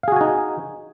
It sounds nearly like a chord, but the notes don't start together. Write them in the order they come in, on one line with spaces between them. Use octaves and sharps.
F5 G#4 F#4 G#5 D#4